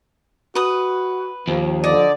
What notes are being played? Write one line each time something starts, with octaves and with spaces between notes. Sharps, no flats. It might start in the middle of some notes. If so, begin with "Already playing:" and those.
F#4 B4 D#6
D#2 F3
D3 D5 D#5